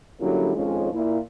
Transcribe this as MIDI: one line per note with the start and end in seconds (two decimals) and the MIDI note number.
0.19 0.51 50
0.19 0.51 54
0.19 0.51 55
0.19 0.51 58
0.19 0.51 61
0.19 0.51 64
0.55 0.88 41
0.55 0.88 51
0.55 0.88 53
0.55 0.88 56
0.55 0.88 61
0.91 1.17 46
0.91 1.17 64